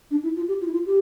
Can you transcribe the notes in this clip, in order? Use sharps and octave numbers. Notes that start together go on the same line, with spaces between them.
D4
E4
F4
G4
F4
E4
F4
G4